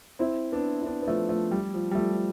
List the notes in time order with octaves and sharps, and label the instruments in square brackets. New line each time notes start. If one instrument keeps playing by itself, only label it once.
[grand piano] C4 E4
B3 D4
E4
B3 D4
B3
F3 A3
F3 A3
G3
F3
G3
F3 A3
F3